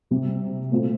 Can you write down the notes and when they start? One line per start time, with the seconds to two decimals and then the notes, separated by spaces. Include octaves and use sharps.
0.11 C3 G3 C4
0.71 A#2 A3 C4 F4